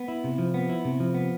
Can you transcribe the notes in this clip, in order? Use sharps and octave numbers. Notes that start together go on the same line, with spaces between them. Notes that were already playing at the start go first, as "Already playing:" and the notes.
Already playing: B3
E4
C3
F3
B3
E4
C3
F3
B3